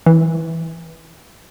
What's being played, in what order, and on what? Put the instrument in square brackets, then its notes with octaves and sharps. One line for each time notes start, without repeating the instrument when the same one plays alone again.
[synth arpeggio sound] E3